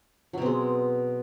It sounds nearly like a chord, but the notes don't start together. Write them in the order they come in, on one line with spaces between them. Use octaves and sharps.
F#3 B2 C4 G#3